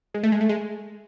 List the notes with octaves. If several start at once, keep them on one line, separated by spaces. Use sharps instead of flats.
G#3
A3
G#3
A3
G#3